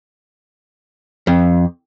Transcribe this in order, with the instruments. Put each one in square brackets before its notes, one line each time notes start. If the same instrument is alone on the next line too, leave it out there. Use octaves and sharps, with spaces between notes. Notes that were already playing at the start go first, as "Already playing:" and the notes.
[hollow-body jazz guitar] F2